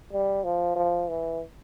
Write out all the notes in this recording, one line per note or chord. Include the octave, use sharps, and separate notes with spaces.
G3
F3
F3
E3